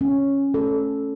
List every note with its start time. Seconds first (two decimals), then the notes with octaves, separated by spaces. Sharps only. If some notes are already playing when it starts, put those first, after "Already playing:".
0.01 C#4
0.54 A4